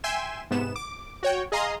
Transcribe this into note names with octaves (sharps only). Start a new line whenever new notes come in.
E5 G5 G#5 C6 E7
G#2 C3 B3 E7
D6
F#4 C#5 G5
G#4 D#5 F5 A#5 C6 D#6